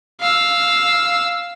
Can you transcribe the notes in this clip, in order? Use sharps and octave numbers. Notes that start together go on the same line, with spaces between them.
F5 E6